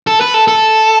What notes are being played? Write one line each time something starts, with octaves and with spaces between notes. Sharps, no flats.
A4
B4
A4
A4